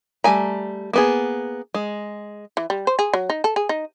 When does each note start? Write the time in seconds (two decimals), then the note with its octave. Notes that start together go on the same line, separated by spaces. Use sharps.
0.24 G3 A3 G#5 A#5
0.93 A#3 B3 G#4
1.74 G#3
2.57 E3
2.70 G3
2.87 C5
2.99 G#4
3.13 F#3
3.30 D#4
3.44 A4
3.56 G#4
3.69 D#4